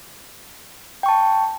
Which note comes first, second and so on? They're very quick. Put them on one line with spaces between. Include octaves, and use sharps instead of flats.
G5 C#6 A5